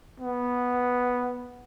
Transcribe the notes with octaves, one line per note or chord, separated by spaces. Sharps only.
B3